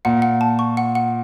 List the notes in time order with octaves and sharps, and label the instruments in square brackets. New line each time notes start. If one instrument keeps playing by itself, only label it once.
[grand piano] A#2 [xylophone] F#5
[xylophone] F#5
A5
C#6
F#5
F#5